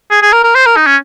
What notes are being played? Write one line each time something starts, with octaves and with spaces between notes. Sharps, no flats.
G#4
G#4
A#4
A#4
C5
A#4
D#4
C#4